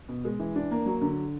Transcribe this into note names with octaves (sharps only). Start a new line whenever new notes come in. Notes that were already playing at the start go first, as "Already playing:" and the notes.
B2
G#3
E3
D4
A#3
F#3
D3